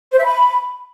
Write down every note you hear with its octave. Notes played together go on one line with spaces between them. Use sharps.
C5
E5
B5